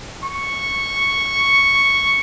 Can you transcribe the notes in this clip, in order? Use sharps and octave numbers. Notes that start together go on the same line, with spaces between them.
C#6